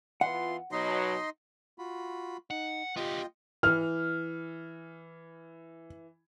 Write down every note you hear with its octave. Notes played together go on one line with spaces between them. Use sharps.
E3 B3 F4 F#5 C6
B2 F#3 D#4 D#5 C6
F4 F#4 B5
D#4 F#5
B3 F4 G4 D#5 G5
E3 F6